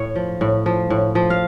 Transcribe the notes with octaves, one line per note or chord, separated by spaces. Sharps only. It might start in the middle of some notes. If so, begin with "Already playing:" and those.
Already playing: A2 C#5
F3
A2
F3
A2
F3
F5